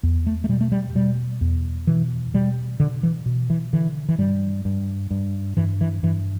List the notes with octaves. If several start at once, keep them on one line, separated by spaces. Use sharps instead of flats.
E2
A3
A3
B2 G3
A3
G3
B2 G3
E2
B2 E3
B2 G3
B2 D3
E3
B2
E3
D3 E3
E3
G2 G3
G2
G2
G2 E3
E3
G2 E3